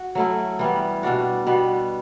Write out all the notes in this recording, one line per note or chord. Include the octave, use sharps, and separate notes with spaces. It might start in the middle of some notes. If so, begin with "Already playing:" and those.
Already playing: F#4
F#3 A3 C#4 E4
E3 G3 B3
B2 G3 D4 F#4
B2 G3 B3